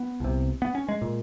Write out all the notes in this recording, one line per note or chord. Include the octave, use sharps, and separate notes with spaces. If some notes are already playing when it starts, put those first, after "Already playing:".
Already playing: B3
C2 C3
B3
C#4
G#3
A#2